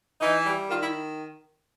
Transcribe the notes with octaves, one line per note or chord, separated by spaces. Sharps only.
E3 D#4
G3
D#3 F4
E4